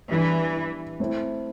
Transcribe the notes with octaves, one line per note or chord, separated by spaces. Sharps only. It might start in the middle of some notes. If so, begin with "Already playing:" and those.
E3 G3 B3 D4
A3 C4 E4